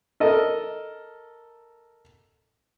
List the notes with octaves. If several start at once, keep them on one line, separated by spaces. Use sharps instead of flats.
A4 A#4 D#5